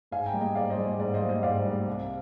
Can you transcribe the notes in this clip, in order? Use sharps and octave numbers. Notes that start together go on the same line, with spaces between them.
G#2 F5 G#5
G5 A#5
G3 A#3
D#5 G5
G#2 D5 F5
C5 D#5
G3 A#3
D5
G#2 D5
C5 D#5
G3 A#3
C5 D#5
G#2 D5 F5
G3 A#3
C2